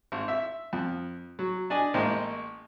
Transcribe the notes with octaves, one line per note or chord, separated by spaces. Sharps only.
G#1
E5
F2
F#3
D4 D5 D#5 G#5
A1 G#3 A#3 C5 G5